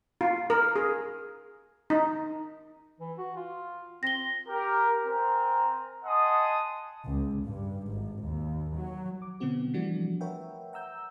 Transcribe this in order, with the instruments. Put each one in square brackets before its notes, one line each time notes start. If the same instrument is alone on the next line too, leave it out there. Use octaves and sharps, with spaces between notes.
[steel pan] F4
A#4
G#4
D#4
[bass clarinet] E3
F#4
F4
[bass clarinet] C4 [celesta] A#6 G7
[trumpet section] G4 A#4
C4 A#4 C5 G#5 A#5
D#5 F#5 G#5 A5 C6 D#6
[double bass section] C#2
G2
G#1
D#2
F#3
[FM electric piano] D6
B2 D3 F#3 B3 C4 F#4
E3 F3 G3 A3 D4 F#4
A#4 B4 C#5 E5 F#5 G5
F#5 A#5 E6 G6